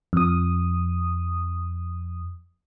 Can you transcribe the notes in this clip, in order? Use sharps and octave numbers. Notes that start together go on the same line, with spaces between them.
F2 D#6